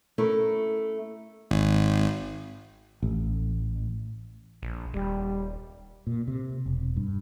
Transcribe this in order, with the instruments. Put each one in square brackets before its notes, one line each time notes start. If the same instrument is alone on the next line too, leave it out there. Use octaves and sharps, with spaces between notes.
[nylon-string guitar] A3 C#4 E4 A#4
[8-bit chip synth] G#1
[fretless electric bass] A1
[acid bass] A#1
[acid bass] D#1 [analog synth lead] G3
[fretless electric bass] A#2
C3
E1
G2